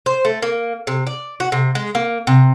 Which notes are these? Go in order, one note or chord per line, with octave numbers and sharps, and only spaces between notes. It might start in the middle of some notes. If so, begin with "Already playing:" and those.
C5
A3
A#3
C3
D5
F#4
C3
G#3
A#3
C3